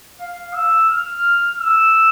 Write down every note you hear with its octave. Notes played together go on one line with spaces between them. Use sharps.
F5
E6
F6
E6